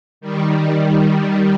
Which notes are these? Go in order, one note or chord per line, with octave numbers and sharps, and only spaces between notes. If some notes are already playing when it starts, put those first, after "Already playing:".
D#3 G3